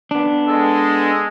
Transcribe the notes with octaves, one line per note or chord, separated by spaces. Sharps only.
B3 D4
G#3 A4